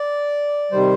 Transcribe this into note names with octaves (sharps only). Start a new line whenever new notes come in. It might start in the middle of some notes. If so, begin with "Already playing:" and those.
Already playing: D5
C3 D#3 G3 C5